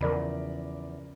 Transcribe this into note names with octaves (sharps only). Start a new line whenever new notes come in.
E2 C#3 F3 A#4 D5 B5